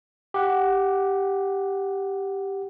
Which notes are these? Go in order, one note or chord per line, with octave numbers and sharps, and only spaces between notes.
G4 F#5